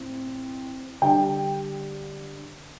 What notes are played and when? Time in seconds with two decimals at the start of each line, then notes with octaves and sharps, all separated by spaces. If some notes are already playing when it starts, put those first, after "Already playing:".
Already playing: A2 C4
1.02 D3 G3 D4 G5